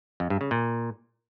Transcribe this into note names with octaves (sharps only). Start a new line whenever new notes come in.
F2
G2
C#3
A#2